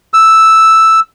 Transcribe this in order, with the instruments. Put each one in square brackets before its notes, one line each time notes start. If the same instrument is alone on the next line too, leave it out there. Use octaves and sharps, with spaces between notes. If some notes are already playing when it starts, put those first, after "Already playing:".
[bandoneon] E6